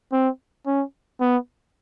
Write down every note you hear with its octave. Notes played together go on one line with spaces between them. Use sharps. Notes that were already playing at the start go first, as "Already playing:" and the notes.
C4
C#4
B3